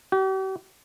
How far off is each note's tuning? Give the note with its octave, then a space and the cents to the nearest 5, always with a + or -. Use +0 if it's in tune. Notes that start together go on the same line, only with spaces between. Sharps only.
G4 -45